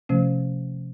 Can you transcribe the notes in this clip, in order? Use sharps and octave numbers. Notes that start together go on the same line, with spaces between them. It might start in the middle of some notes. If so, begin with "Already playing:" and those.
C3 F3 A3 C#4